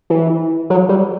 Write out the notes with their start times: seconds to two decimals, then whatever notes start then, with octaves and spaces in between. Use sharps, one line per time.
0.10 E3
0.70 F#3
0.89 G3